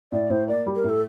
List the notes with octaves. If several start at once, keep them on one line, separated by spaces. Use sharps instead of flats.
A2 D5
A2 C5
A#3 D5
G3
A#4
A2
A4